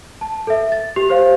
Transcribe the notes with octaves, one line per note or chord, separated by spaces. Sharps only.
A5
A4 E5
A6
G4 F7
G4 C5 C#5 F5